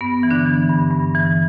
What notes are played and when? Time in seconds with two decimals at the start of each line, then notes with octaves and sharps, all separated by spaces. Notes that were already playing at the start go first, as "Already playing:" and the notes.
0.01 G2 B3
0.23 E3
0.31 D3 D4
0.46 E3
0.69 G2
0.91 G2
1.15 E3